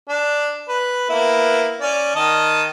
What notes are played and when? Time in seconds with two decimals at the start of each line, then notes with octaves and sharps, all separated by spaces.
0.09 D4
0.68 B4
1.09 A#3 B3 E4
1.81 C#4 D5
2.16 D#3 D#5 A5